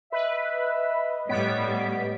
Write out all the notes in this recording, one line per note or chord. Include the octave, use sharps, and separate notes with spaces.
B4 D#5 E5
A2 G3 B3 C#5 B6 D7